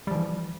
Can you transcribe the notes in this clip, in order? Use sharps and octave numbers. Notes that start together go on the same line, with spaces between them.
E3 F3 G3